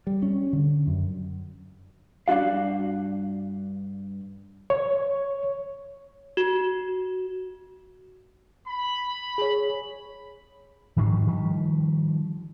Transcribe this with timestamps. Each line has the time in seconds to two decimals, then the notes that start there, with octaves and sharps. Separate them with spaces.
0.07 G3
0.22 C#4
0.53 D3
0.87 F#2
2.28 G2 D4 F#4 F5
4.70 C#5
6.37 F#4
8.67 B5
9.38 G#4 C#5
10.97 G#2 D#3 F3 D4
11.27 D#3 F3 G3